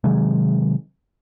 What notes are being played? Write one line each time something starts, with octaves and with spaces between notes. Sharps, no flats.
C3 D#3 F#3 G#3